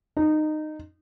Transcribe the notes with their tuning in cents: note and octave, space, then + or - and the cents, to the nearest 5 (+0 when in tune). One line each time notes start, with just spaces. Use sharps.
D#4 -20